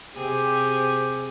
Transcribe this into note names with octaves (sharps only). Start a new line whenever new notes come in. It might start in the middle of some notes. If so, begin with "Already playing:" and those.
C3 C4 G4 G#4